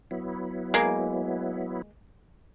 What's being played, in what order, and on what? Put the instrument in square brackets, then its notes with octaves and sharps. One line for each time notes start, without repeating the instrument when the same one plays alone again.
[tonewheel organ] F#3 B3 E4
[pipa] G#3 A#3